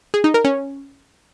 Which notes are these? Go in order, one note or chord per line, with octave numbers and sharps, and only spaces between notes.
G#4
D#4
A#4
C#4